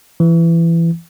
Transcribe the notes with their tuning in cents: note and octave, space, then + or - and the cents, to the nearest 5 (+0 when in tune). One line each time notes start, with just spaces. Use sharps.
E3 +20